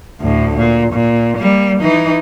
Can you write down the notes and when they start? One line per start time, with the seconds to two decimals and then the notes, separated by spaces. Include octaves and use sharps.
0.20 D2 A2
0.56 A#2
0.92 A#2
1.38 G3 A#3
1.79 E3 D#4